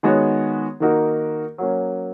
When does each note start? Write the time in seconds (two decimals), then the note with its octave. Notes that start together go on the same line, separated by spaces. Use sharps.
0.03 D#3 G#3 B3 F#4 C#5
0.80 D#3 A#3 D#4 F#4 A#4
1.58 F#3 A#3 C#4